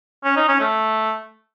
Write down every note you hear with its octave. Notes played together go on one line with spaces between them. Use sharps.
C#4
D#4
C#4
A3